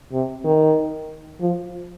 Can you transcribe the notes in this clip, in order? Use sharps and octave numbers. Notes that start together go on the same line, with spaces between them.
C3
D#3
F3